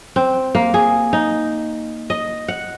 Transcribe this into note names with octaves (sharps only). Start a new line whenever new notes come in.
C4
A#3
G#4
D#4
D#5
F#5